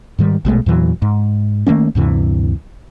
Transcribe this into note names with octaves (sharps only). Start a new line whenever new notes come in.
G#2 D#3 G3
A#1 B2 G#3 A3
E2 A#2 E3 F#3
G#2
D#3 A3 A#3 C#4
D2 G2 C3 E3